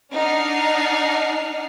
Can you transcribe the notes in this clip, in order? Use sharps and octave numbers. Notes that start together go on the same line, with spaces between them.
D4 D#4 F#5 F6 C7